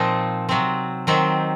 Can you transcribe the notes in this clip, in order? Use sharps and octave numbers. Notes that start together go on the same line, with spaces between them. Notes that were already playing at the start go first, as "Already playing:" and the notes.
Already playing: A#2 F3 C4 D#4
C3 F#3 C4
D#3 F#3 C4